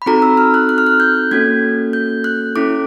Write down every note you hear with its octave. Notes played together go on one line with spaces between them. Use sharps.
B5
C4 D#4 F#4 A4 A#5
E6
F6
F#6
F#6
F6
F#6
G6
A#3 C#4 F#4 A4 G#6
G6
F#6
C#4 E4 A4 D6